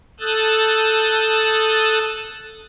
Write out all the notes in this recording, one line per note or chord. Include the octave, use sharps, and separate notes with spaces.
A4 D#6 E6 F#6 G6 A6